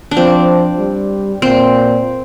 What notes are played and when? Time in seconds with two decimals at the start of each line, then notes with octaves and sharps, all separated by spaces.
0.11 D4
0.17 F3 C4
0.79 G3
1.42 A#2 C4